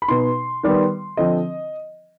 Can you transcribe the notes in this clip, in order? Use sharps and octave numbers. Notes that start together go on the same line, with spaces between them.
B5
B2 B3 D#4 C6
D#3 G3 B3
D3 F3 C4 D#5